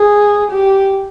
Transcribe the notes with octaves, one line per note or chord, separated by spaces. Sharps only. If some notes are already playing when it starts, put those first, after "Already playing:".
Already playing: G#4
G4